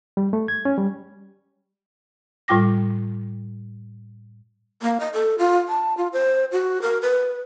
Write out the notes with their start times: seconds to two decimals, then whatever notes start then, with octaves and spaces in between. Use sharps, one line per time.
0.17 G3
0.33 A3
0.48 G#6
0.65 C#4
0.78 G3
2.48 A2 G3 F4 G5 D6 A#6
4.82 A#3
5.00 D#5
5.13 A4
5.38 F4
5.68 A5
5.97 F4
6.13 C5
6.52 F#4
6.82 A#4
7.02 B4